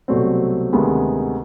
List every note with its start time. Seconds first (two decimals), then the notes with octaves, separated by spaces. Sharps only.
0.08 C2 B2 F#3 A3 C4
0.73 D2 C3 D#3 G#3 B3